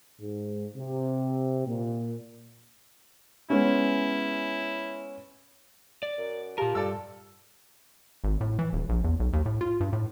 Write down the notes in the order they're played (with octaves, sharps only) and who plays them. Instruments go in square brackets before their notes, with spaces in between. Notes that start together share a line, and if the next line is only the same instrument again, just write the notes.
[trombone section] G#2
C3
A#2
[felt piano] G#3 B3 C#4 [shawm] E4
[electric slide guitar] D5
[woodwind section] F#2
[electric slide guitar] A#2 A#4 [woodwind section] F4 A5 [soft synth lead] G4
[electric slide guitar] G2 [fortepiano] A4 D5 E6
[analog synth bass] G#1
A2
E3
D#1
A#1
E2
B1
D#2
A2
F4
G2
A2